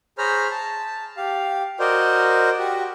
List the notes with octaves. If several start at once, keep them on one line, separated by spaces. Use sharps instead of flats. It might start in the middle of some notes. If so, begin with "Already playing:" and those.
G#4 C5 C#5 A#5 B5 F6
A5
G4 F5
F#4 A#4 C5 D5 D#5
F#4 G4 F#5